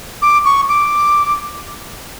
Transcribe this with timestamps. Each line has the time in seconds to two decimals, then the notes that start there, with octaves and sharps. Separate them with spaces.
0.22 D6
0.45 C#6
0.68 D6